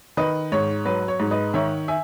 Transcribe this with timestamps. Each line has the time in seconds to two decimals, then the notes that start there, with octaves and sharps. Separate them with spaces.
0.17 D#3 B4 D#5
0.52 G#2 C#5
0.85 F#3 B4
1.08 C#5
1.20 G#2
1.31 B4 D#5
1.54 D#3 C#5 E5
1.88 E5 G#5